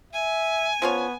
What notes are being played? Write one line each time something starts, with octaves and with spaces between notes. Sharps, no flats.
E5 G#5
F3 B3 C#4 C#5